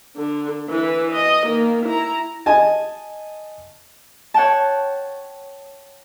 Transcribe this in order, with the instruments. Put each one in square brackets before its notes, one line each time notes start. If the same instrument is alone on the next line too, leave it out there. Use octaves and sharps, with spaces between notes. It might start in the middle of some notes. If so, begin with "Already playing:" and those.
[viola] D3
E3 B4
D#5
D#3 A#3
E4 A#5
[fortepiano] D#5 G#5 A5
[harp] C#5 F#5 G5 A5